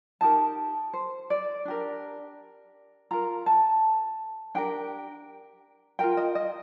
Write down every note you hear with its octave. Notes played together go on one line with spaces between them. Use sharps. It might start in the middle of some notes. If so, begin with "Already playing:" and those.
D#4 G4 A#4 A5
C5
D5
D4 G4 A#4
F4 A#4 A#5
A5
D4 G4 A#4 G5
F4 A#4 G5
D#5
D#5